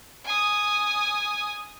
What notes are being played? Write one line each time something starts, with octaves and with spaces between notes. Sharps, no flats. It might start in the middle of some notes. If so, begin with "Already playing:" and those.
G#5 D#6